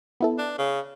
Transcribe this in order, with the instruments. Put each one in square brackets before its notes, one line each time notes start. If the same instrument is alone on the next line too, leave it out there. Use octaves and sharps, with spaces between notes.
[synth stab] B3 E4 A4
[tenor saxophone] D4
C#3